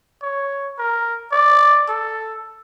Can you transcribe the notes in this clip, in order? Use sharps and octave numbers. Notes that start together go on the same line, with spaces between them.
C#5
A#4
D5
A4